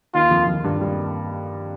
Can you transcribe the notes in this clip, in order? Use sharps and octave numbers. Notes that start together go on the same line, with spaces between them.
D#2 D#3 F4
F2 F3
F2 F3
G2 G3
G3